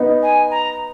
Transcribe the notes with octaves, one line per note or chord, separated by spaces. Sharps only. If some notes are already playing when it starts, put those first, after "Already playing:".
Already playing: B3 D#4
G#5
A#5